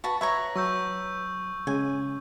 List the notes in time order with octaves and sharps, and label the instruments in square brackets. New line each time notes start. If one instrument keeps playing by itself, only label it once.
[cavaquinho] F#4 B4 A5
[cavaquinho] B4 C#5 A#5 [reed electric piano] E5 [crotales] E6
[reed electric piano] F#3 [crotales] C#6 E6 G6
[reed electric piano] C#3 G#3 C#4 [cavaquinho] G#5